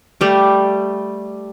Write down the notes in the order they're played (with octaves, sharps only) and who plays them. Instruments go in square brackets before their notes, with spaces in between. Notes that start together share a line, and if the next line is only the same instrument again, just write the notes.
[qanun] G3 A3